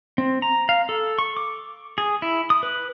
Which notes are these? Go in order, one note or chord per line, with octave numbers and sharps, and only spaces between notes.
C4
A#5
F5
A4
C#6
D6
G#4
E4
D#6
B4